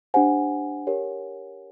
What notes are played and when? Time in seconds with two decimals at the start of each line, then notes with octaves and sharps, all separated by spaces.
0.14 D4 G4 C5 F#5 G#5
0.87 G4 A#4 C#5